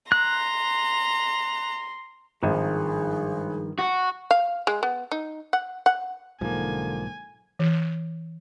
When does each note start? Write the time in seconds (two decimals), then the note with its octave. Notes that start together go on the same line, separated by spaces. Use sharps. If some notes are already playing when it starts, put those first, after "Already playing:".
0.12 A#5 C6 F#6
2.43 G#1 G2 D#3 F3 G#4
3.79 F#4
4.31 F5
4.67 G#3
4.83 B3
5.11 D#4
5.53 F#5
5.86 F#5
6.41 B1 G#2 D3 F3 A#3 G#5
7.59 E3